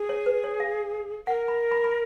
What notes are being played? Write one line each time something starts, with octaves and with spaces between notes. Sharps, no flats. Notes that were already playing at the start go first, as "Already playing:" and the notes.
Already playing: G#4
C#5
B4
C#5
F5
A#4 F#5
B5
B5
B5